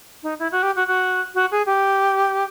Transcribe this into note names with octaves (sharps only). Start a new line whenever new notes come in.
D#4
E4
F#4
G4
F#4
F#4
F#4
G#4
G4